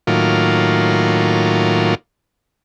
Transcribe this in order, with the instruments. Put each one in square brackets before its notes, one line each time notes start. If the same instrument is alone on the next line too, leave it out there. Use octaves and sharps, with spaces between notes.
[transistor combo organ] A2 D#3 F#3 A#3 F4